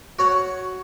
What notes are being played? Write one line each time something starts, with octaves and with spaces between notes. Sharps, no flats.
F#4 C#5 F#5